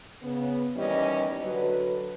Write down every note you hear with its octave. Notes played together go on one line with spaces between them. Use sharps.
C#3 B3
D#2 E3 G3 C#4 D#5
D3 F#3 B4